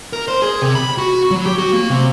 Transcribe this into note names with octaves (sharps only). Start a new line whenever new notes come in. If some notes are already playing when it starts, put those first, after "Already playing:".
A#4
C5
G#4
C3
B5
F#4
F#3
G4
F#4
A#3
C3